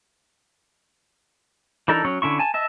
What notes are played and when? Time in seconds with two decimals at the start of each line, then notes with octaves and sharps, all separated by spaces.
1.88 E3 D4 D#4 A4 A#4
2.05 F#3 C#4 C#5
2.22 D3 C#4 E4 C#6
2.39 G#5 A5
2.54 D#5 E5 A5